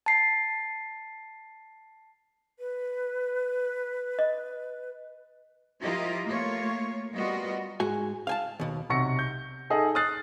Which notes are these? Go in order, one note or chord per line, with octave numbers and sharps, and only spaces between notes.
A5 C7
B4
D#5
F3 E4 F4 G4 A#4 D#5
A3 A#3 F4 C#5
G3 B3 F4 F#4 A#4 D#5
G#2 F#4 G#5
F5 G#5 A5
D#2 B2
B1 C3 F#5 C#6 A#6 C#7
G6
D#4 G#4 A4 D#5
D#6 F6 F#6 A6 C7